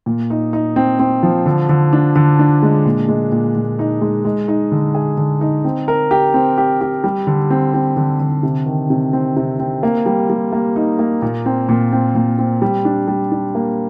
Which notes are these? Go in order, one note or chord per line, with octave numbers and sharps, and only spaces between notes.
A#2
D#4
D#4
C4
C4
F3
D3
D3
D4
D3
D4
G#3
A#2
G#3
A#2
A#2
D#4
G#3
G#3
D#4
D3
G#4
D3
D#4
C4
A#4
G4
C4
G4
G4
G3
D3
C4
C4
D3
D3
C3
D#3
C3
C4
C3
C4
A#3
G3
G3
A#3
D#4
A#3
A#2
C4
A#2
C4
A#2
C4
G3
D4
G3
D4
A#3